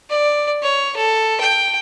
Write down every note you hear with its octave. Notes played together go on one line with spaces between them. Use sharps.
D5
C#5
A4
G5